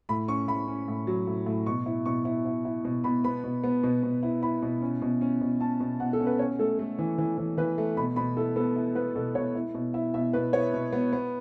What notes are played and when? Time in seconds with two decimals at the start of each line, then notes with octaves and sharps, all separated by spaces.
0.09 A2 B5
0.28 C#4 C#6
0.48 A2 B5
0.68 C#4
0.88 A2
1.07 F#3
1.27 A2
1.46 A2
1.66 B2 C#6
1.86 E4
2.06 B2 C#6
2.25 E4
2.45 E4
2.65 E4
2.85 B2
3.04 B2 B5
3.24 B3 B5
3.44 B2
3.64 B3
3.83 B2
4.03 B2
4.23 E4
4.42 E4 B5
4.62 B2
4.82 C#4
5.02 B2
5.21 C#4
5.41 B2
5.61 C#4 A5
5.80 B2
6.00 B2 F#5
6.13 A4
6.20 C#4
6.26 B4
6.39 C#4 C#5
6.59 A3 A4
6.79 A3
6.99 E3
7.18 E3
7.38 E3
7.58 E3 B4
7.78 A3
7.97 B2 B5
8.16 B2 B5
8.37 E4 A4
8.56 B3 A4
8.76 E4
8.95 B3 B4
9.15 B2 A4
9.35 B2 C#5
9.55 E4
9.74 B2
9.94 E4 E5
10.14 B2 E5
10.33 B2 B4
10.53 B3 C#5
10.74 B2
10.93 B3
11.13 B3